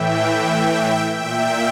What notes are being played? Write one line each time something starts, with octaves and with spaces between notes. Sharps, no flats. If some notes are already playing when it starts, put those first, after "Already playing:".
Already playing: A2 E3 E5 G5
A#2 E5 G5